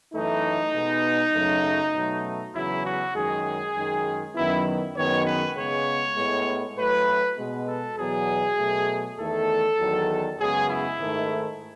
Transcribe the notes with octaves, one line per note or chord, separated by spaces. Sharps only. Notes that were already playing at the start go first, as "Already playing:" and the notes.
F#2 E3 A3 D#4
B2 G#3 B3
F#2 C#3 F#3 A3
B2 F#3 A3
E2 C#3 F#3 B3 E4
F#4
F#2 D#3 G#3 G#4
F#2 D#3 G#3
F#2 D#3 F#3 B3 E4
F#2 D#3 G#3 B3 C#5
B4
C#3 G#3 B3 C#5
A2 G#3 B3
A2 F#3 A3 B4
B2 G#3 B3
A4
E2 B2 F#3 B3 G#4
B2 F#3 A3
E2 D#3 A3 A4
E2 D#3 F#3
F#2 C#3 G#3 B3 G#4
E4
G#2 D#3 A3